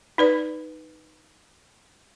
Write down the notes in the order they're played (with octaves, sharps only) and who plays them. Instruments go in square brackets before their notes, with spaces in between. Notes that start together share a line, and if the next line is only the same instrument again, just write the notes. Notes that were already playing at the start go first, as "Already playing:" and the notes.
[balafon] D#4 B4 D5